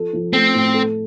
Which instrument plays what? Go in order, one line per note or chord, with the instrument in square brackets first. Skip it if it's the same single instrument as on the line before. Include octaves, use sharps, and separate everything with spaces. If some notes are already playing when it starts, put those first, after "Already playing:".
Already playing: [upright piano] F3 A4
F3
[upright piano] A3 [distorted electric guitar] C4
[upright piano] A2
A4